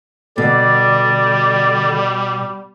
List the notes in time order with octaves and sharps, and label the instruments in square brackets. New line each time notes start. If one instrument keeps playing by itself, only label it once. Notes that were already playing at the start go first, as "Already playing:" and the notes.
[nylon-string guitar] B2 [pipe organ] D3 [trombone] G3 [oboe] D5